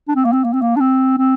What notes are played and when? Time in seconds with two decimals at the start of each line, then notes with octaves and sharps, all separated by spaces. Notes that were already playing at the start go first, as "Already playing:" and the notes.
0.08 D4
0.16 C4
0.25 A#3
0.33 C4
0.44 A#3
0.53 C4
0.62 A#3
0.76 D4
0.80 C4
1.18 C4